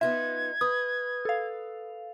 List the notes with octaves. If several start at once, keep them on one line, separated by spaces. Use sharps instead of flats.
B3 D#4 F4 E5 G#6
B4 D#6
A4 F5